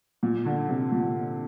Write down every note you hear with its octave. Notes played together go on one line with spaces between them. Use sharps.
A#2
D3
C3
A#2